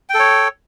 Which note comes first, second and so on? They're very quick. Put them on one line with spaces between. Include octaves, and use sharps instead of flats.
G5 A4 C#5